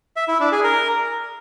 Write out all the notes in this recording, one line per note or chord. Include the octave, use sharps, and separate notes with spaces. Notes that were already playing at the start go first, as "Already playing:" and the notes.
E5
E4
D4
G#4
A#4